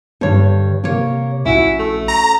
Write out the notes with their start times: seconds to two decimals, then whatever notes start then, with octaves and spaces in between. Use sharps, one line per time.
0.21 G2 D3 C#5
0.84 C3 A#3 C#5
1.45 A#1 C#4 E4 F#4
1.79 A3
2.08 A#5